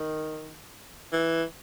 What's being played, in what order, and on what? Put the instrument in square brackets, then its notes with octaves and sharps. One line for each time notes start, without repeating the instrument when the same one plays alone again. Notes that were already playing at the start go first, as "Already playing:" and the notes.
Already playing: [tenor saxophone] D#3
E3